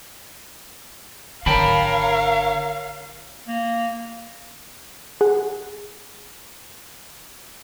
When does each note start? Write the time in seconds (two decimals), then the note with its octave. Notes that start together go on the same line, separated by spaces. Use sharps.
1.46 G#1 D3 A#4 C#5 F5 G5 A5 B5
3.48 A#3
5.21 G#4 F#5